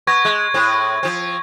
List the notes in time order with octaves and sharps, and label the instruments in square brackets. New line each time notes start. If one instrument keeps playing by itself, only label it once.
[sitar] B3 [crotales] C#6 G#6 A#6
[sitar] G#3
A2 C4
F3 C4